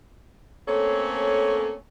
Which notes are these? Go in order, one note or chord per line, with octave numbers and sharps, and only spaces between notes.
A3 A#3 C4 C#4 A4 C#5